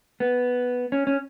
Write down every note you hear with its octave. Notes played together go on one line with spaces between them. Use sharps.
B3
C#4
C#4